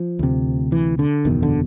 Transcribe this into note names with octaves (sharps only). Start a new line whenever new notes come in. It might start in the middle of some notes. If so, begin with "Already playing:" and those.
Already playing: F3
D2 C3
E3
D3
F#1 E2 B2 D#3
D3